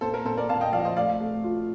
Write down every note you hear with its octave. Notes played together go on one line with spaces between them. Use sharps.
A#2 A4 C5
A#4
A#2 A4 C5
A#4 D5
A#2 F5 A5
D#5 G5
F3 D5 F5
C5 D#5
A3 D5 F5
A3
F4